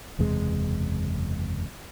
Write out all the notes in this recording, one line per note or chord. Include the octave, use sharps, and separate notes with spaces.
F#1 E2 C3 G#3